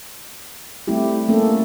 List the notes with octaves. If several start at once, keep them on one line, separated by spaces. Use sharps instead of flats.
G3 A3 C4 E4 G4
A3 A#3 C#4 A4